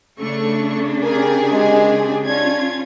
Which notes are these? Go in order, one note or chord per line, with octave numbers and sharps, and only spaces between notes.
C#3 A3 D4 C#6
G4 G#4 A#4 G#5
G#3
C#4 D4 F4 G#6